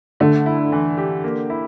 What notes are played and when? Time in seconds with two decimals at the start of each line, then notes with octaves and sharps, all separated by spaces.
0.20 D3 A3
0.46 E4
0.72 E3
0.98 G4
1.24 A#3
1.50 E4